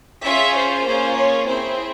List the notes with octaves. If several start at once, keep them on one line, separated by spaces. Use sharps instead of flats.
C#4 F4 G#4 E5
C5
A#3 C#4 F4 G#4
C#5
C4 E4 G#4 C5